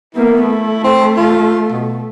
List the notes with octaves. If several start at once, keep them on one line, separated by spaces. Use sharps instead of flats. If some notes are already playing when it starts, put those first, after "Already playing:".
A#3 B3 E4
A3
C4
F4
B2